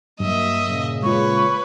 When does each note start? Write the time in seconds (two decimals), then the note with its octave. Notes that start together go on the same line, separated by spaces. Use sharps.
0.20 G2 F#3 A#3 D#5 E5
0.66 A#2 C#3
1.03 G#3 F4 B4 C#5 C#6